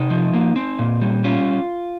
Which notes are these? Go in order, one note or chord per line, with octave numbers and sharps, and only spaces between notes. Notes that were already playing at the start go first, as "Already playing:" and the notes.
Already playing: C3 D#4
F3
A#3
C4
A#2
G3
C#4 F4